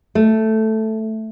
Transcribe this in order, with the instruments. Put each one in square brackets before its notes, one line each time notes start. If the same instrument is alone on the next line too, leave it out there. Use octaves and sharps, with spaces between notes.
[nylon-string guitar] A3